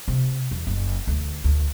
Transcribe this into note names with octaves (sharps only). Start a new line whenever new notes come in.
C3
E2
F#1
D2
D2